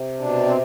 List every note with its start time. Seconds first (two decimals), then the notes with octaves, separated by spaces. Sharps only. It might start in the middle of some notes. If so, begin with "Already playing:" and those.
Already playing: C3
0.19 B2 D4
0.46 C4